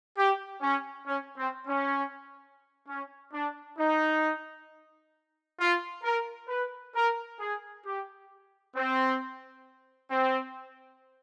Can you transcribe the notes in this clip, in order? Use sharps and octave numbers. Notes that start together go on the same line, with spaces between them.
G4
C#4
C#4
C4
C#4
C#4
D4
D#4
F4
A#4
B4
A#4
G#4
G4
C4
C4